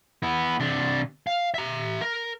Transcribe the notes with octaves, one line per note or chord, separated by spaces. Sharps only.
B3 E4
C3 D4
F5
E5 A#5
A#4